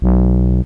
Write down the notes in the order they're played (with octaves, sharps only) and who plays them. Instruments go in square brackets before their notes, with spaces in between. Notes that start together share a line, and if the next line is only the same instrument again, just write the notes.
[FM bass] B1